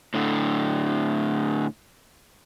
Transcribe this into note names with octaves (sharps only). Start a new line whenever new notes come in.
A2 D3